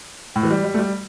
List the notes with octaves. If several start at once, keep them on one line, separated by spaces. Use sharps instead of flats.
A2
E3
G3
G3
A3
G3